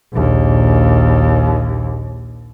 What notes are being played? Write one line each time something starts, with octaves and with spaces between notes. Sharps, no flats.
A#1 D#2